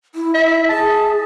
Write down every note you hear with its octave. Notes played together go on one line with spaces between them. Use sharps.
E4
E4 E5
G#4 A5